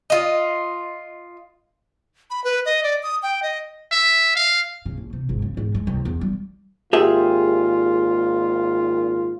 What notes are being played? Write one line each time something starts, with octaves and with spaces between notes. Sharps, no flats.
F4 D#5
B5
B4
D#5
D5
D#6
G5
D#5
E5
F5
C#3
A#1
C3
G#1
C#3
G#2
G#3
C2
E2
G3
G#1 A#2 F4 G4 G#4 E5